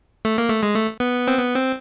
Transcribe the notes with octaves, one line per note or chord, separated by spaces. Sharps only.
A3
A#3
A3
G#3
A3
B3
C4
B3
C4